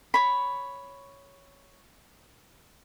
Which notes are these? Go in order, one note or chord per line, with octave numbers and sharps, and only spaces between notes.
C#5 B5